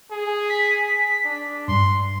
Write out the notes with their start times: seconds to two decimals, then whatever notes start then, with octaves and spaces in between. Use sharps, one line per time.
0.11 G#4
0.50 B6
1.25 D4
1.68 G2 C6